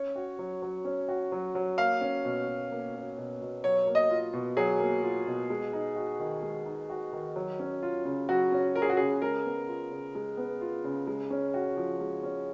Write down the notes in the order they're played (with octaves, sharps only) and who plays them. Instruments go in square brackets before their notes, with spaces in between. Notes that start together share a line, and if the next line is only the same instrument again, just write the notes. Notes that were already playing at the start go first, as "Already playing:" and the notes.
Already playing: [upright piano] C#4 [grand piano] C#5
[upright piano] F#4
F#3
F#3
C#4
F#4
F#3
F#3
[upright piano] A#3 [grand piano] F5
[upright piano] C#4
B2
B2
A#3
C#4
B2
B2
[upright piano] F#3 [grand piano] C#5
[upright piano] A#3
[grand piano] D#5
[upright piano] F4
B2
[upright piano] F#3 [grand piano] G#4
[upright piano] A#3
F4
B2
G#3
D#4
F#4
D#3
G#3
D#4
F#4
D#3
F#3
C#4
F4
C#3
[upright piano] F#3 [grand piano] F#4
[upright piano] C#4
[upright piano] F4 [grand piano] A#4
[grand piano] G#4
F#4
[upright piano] C#3 [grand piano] G#4
[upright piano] G#3 [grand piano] A#4
[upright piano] B3
F4
C#3
G#3
B3
F4
C#3
G#3
C#4
F#4
F3
G#3
C#4